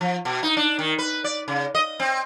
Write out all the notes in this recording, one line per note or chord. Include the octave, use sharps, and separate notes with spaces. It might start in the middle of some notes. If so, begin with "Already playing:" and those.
F3
B2
D#4
D4
D#3
B4
D5
C#3
D#5
C4